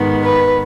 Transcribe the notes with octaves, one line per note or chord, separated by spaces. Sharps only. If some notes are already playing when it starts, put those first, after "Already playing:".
Already playing: G#2 D#3 B3
B4